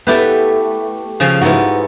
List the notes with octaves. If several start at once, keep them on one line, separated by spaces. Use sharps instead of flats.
A3 B3 E4 G4 B4
C#3 F3 C#4
G#2 B3 E4 F#4